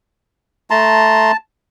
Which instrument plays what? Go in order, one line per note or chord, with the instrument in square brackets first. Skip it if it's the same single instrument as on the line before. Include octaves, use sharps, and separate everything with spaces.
[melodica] A3 A#5 C6 [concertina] A5